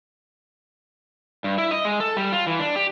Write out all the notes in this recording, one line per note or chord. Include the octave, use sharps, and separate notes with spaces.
G2
E4
D#5
G#3
A4
G3
F4
E3
D4
G4